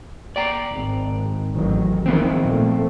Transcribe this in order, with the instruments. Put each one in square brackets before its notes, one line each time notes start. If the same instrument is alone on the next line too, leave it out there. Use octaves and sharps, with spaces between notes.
[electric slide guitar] D5 G5 A#5
[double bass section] G#1
A1 D#3 F#3
[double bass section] D#3 G#3 [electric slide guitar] F3 B3 C4
[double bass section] A#2 A3